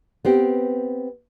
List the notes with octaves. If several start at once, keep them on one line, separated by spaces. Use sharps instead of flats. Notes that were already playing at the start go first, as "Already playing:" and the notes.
B3 C4 G4